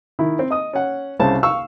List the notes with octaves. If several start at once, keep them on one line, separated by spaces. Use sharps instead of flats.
D#3 E4
C4
D#5 D#6
C#4 F#5
C2 C#3 C5 A5
F5 C#6 E6